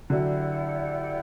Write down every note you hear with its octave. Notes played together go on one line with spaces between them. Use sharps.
D3 F#3 E4 G4 D5 F#5